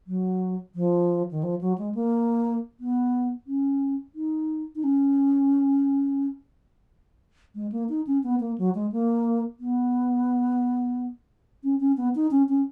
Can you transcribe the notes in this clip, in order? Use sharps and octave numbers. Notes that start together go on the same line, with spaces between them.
F#3
F3
D#3
F3
F#3
G#3
A#3
B3
C#4
D#4
D#4
C#4
G#3
A#3
D#4
C#4
B3
A#3
F#3
G#3
A#3
B3
C#4
C#4
B3
D#4
C#4
C#4